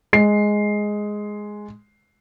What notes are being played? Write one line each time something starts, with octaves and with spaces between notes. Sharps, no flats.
G#3 C7